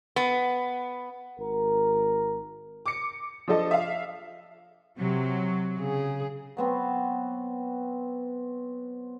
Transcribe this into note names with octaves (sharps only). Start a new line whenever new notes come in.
B3
G#1 A#4
D6 C#7
F3 D4 A4 D#5
E5 F5
C3 F#3
C#3 G#4
F#3 B3 C4